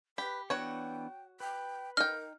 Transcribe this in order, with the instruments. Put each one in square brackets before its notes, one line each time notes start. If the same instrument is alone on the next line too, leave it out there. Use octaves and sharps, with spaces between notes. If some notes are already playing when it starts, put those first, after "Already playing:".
[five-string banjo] G4 [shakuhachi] B4 [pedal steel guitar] B5
[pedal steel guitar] E3 B3 D4 [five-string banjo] F#4 C#5 [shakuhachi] G5
[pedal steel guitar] B4 [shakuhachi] G5
[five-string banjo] D#4 G5 [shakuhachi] A#4 [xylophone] F6